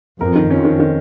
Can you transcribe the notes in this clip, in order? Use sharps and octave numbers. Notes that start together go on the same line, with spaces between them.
F2 A#4
D#3
F2 C#4
D#3
D#3